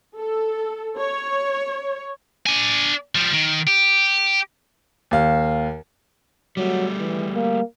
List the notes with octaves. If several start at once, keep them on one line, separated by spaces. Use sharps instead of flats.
A4
C#5
D4 G#5
F3 G3
D#3
G4
D#2 F5
F#3 G3 A3
E3
A#3